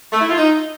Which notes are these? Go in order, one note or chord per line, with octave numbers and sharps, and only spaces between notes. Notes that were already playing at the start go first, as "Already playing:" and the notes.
A3
E4
F4
D#4